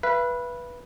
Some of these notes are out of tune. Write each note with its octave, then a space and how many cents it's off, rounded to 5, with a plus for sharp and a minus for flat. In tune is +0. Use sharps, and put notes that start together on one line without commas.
B4 -10 E5 +45